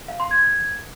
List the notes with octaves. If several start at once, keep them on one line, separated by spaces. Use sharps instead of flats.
F5
C6
G#6